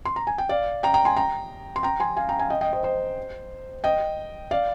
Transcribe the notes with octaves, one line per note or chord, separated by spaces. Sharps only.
C6
A#5
G#5
G5
D5 F5
G5 A#5
G5 A#5
G#5 C6
G5 A#5
C6
G5 A#5
G#5 C6
F5 G#5
G5 A#5
F5 G#5
D#5 G5
D#5 G5
C5 D#5
C5 D#5
D#5 G5
D5 F5